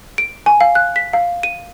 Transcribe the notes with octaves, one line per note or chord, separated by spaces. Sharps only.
D7
G#5
F5
F#6
B6
F5
D#7